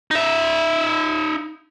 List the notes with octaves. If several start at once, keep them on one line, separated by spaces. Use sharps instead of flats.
D#4 E5